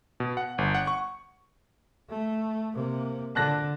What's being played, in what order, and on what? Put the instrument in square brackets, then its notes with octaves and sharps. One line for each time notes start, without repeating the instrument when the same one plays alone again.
[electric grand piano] B2
F#5
G1
F#5
C#6
[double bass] A3
C3 A#3
[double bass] D3 [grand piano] A5 F#6 A#6